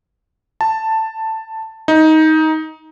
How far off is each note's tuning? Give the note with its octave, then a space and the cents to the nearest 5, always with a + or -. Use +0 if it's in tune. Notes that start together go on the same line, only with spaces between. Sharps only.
A5 +10
D#4 +15